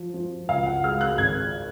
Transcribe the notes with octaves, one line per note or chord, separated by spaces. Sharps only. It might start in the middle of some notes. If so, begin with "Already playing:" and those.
Already playing: F3
F3
C#2 F5
F#5
G#3 F6
F#6
G#1 G#6